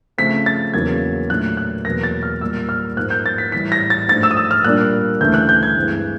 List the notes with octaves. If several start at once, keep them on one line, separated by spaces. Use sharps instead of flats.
C#3 F3 A3 C4 B6
A6
E2 C#3 F#3 A#3 D#4 G#6
A#2 F#3 A3 D4 F4 F#6
F#6
E2 B2 F#3 A#3 A#6
A6
F6
A#2 G3 A#3 E6
F6
G#2 F3 A#3 F#6
G6
A6
B6
A2 E3 G3 B6
A#6
A6
G#2 F3 A3 D4 A6
E6
D#6
E6
F6
A#2 G3 A#3 D4 F#6
D2 C#3 E3 A3 G6
F#6
G6
G#6
G2 E3 G#3 C4 E4